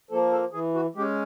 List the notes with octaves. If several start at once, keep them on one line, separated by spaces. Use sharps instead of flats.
F3 A#3 A4
A4
E3 G#4
F#4
G#3 C#4 G4